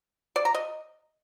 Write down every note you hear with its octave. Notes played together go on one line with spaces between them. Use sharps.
D5
A#5
D#5